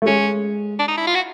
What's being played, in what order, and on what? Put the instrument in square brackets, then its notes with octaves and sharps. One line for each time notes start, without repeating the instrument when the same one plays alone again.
[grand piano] A3
[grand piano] G#3 [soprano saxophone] C#4
[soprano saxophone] D4
D#4
E4
F4
F#4